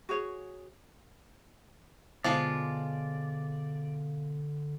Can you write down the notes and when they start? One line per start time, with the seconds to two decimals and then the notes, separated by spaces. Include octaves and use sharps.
0.09 F#4 G#4 C#5
2.24 B2 D3 F3 G#3 B3 F4 D5